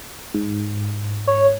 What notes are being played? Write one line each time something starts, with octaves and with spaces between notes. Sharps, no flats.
G#2
C#5